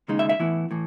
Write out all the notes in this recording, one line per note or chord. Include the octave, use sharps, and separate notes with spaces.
D#2 C#3 G#3 D#4
E5
E5
A2 E3 B3 E4
A2 E3